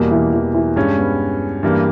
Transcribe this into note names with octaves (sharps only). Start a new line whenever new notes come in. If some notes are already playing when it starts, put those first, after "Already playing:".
Already playing: E2 B2 G3 A#3
E3
E3
E3
G2 G3 G#3 C#4
B3
G2 E3 G3 A#3